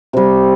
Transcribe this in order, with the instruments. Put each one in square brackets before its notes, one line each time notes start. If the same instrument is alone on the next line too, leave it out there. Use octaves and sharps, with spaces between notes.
[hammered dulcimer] C3 G3